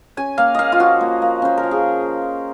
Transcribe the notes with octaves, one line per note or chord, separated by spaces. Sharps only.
C#4 G#5
A#3 F5
A#3 D#5 F5
F4
F3 F#4
A#3
A#3
C#4 C5
A#4
F3
G#4